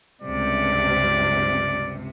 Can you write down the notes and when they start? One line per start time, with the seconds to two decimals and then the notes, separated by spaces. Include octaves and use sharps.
0.22 C#2 G2 C3 D5